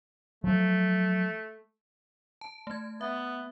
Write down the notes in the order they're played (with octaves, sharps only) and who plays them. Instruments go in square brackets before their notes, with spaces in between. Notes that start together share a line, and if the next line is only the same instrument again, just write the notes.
[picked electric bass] F3 F#3 [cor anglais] A3
[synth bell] A5
A3 G#6
[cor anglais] B3 [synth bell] E5